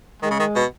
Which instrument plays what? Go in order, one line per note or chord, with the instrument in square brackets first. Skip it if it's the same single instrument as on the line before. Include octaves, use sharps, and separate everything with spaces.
[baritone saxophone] D#3 [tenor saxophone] G#3
[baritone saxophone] C#3
D#3
B2